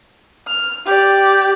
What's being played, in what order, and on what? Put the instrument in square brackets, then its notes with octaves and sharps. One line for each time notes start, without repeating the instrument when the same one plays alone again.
[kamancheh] F6
G4 D5